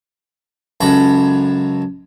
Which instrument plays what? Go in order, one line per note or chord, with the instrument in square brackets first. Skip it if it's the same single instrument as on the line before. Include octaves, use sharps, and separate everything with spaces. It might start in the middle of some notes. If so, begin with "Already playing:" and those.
[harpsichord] C#2 F#2 A4 A#5 B5